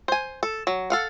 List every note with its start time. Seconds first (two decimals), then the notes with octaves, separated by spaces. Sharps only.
0.08 C5 G#5
0.43 A4
0.67 F#3
0.90 A4 F5 F#5